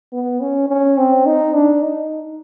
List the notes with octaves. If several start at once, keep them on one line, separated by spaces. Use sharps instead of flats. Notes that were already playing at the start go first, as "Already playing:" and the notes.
B3
C#4
C#4
C4
D#4
D4
D#4